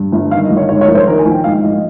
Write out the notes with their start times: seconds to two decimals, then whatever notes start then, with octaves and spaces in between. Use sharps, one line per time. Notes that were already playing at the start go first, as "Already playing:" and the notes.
Already playing: G2
0.12 G1
0.31 D#3 F5
0.44 D#5
0.51 G1
0.57 C#5
0.69 G#2 C#5
0.81 C#5
0.88 A#1 A#4
0.95 C5
1.07 D#3 A#4
1.19 G#5
1.25 A#1
1.31 G5
1.44 G#2 F5
1.63 A#1 D#5